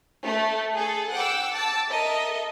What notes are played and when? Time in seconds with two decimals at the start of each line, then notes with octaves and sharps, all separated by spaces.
0.25 A3
0.74 G#4 A4
1.13 F#5 G5 D6 E6
1.53 A5 D6 E6
1.90 A4 A#4 D#5 E5